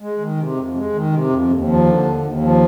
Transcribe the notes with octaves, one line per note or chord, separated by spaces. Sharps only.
G#3
D#3
C3
F2
G#3
D#3
C3
F2
D#2
F3
D3
D#2
D#2
F3